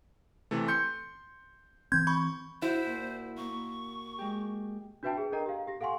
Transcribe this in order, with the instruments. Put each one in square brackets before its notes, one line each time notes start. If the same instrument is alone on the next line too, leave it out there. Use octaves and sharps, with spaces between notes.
[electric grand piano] C3 E3 A3
C6 G6 C#7
[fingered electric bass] E3 C4 [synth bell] C6 G6 G#6
[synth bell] B5 [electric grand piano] C#6
[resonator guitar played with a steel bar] E4 [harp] F#4 E5 [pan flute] C5
[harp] A#2
[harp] A#3 [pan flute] C#6
[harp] G#3 G4
[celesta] D4 F#4 B4 E5 G5 A5
G#4 B4
D4 A4 A#4 D#5 G5 A#5
G4 F5
G4 A#6
A4 F5 F#5 G#5 C6 C#6